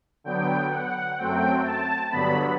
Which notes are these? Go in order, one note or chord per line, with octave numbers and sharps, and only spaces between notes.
D3 F#3 B3 G5
F#5
F#2 F#3 A3 C4 G5
A5
G2 D3 F#3 B3 B5